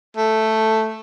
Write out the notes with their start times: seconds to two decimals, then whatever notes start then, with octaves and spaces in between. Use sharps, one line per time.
0.17 A3